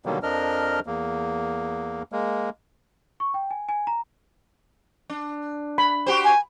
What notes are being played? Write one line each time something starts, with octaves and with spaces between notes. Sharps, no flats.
B2 D3 D#3 F#3 G3 A#3
F2 F3 D4 A#4 D#5 F6
E2 A#3
G#3 A#3
C#6
G5
G#5
G#5
A#5
D4
B5
F#4 G4 C5
G#5